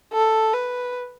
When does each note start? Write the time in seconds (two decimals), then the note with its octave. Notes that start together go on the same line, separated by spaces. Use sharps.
0.13 A4
0.53 B4